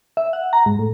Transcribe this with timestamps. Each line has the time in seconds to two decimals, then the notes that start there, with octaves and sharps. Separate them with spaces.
0.17 E5
0.33 F#5
0.53 A#5
0.66 G#2
0.79 A2